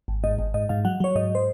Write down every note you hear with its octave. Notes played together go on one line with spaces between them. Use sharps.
G#1
G#2 D#5
G#1
G#2 D#5
G#2 F5
F#3 F#5
F#3 C#5
G#2 D#5
C5